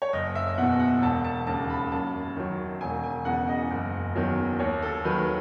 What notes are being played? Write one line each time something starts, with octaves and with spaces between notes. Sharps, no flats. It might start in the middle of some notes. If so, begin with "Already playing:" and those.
C#5
F#1 D#5
E5
E2 B2 F#5
F#5
E1 A5
A5
D#2 C#3 A5
B5
F#2 A5
D#3 F#3
E1 G#5
G#5
E2 C#3 F#5
D#5
F#1
E2 D#3 F#3
D#2 C#5
A4
D#3 F#3 B4